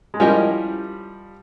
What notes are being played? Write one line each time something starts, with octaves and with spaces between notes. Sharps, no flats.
G#3
F3 G3 C#4 E4 G4 A#4 D#5